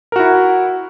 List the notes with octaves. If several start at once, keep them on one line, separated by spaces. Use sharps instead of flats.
E4 F#4 A#4